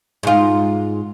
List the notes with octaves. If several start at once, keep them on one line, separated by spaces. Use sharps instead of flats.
G#2 F4